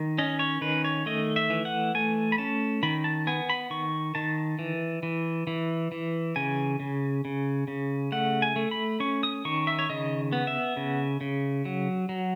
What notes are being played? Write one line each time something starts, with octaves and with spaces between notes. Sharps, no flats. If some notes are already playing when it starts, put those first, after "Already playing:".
Already playing: D#3
C#4 D#5
C#5
D#3 B4
C#5
A3 D#5
E5
E3
F#5
A3 G#5
B5
C#4 A5
D#3 B5
A5
B3 G#5
B5
D#3 C#6
D#3 A5
E3
E3
E3
E3
C#3 G#5
C#3
C#3
C#3
A3 F#5
G#5
A3
B5
C#4 C#6
D#6
D#3 C#6
E5
C#5
C#3 D#5
B3
E5
C#3
C#3
F#3
F#3